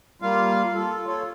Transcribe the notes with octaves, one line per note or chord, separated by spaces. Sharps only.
G3 A#3 F4 F5
F4 A4
F4 A4 C#5